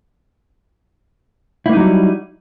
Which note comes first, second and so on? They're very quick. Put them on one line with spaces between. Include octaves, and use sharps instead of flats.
E4 A#3 D#4 F#3 G3